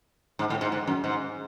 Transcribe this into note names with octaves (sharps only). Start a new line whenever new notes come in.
G#2
A2
G#2
G#2
F#2
G#2